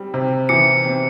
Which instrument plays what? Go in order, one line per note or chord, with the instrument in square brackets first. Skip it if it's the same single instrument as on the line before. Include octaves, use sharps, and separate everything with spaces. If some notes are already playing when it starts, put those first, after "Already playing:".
Already playing: [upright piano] G3 C4
C3
[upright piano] E3 [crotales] C#7
[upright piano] C4